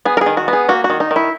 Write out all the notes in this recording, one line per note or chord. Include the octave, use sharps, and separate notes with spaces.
B3 G#4
A#4
G#4
D#3
F#4
B3
G#4
A#3 F#4
F#4
D#3
D#4
D#3
E4